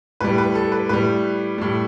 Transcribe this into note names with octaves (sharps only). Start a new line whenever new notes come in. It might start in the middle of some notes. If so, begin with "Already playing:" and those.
A2 G3 B4
B4
A4
B4
A2 G3 B4
A2 G3